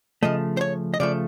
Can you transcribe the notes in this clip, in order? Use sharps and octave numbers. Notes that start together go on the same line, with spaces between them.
C#3 F3 A3 D#5
C5
C#5
D#5
C#3 F3 A3 D5